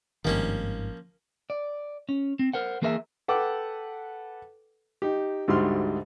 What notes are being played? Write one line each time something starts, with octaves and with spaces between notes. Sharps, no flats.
G#1 G2 D#3 F3 A#3 C#4
D5
C#4
C4
A#4 C5 F#5
E3 A#3 G#4 A#4 C5 E5
A4 B4 F#5 G5 D6
D#4 G4
D2 G#2 G3 F#4 C6 F6